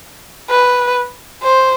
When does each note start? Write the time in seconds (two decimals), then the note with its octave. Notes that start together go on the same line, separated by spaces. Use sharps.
0.50 B4
1.43 C5